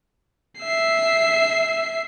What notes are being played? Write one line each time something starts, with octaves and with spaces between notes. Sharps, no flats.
E5 C7